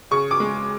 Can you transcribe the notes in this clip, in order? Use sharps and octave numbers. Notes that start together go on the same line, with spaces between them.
C#3 C#6
D6
G#3